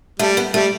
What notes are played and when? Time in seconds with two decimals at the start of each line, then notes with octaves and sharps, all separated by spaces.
0.19 G3 A3
0.37 B3
0.54 G3 A3